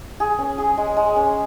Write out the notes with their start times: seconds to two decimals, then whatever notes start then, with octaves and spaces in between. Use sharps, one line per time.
0.20 G#4
0.39 C#4
0.58 G#4
0.78 G#3
0.97 G#3
1.16 C#4